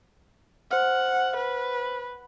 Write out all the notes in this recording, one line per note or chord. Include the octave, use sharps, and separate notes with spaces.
C5 F#5 F6
B4